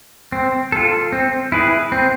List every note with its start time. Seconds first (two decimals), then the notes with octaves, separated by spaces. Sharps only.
0.32 C4
0.72 F4 A4
1.13 C4
1.52 E4 G#4 B4
1.92 C4